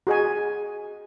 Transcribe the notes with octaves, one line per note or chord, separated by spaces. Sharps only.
F#4 G#4 D#5 G#5